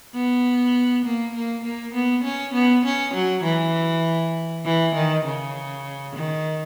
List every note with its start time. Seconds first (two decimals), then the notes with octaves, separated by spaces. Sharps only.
0.15 B3
1.05 A#3
1.35 A#3
1.65 A#3
1.94 B3
2.24 C#4
2.54 B3
2.85 C#4
3.14 F#3
3.44 E3
4.65 E3
4.95 D#3
5.26 C#3
6.16 D#3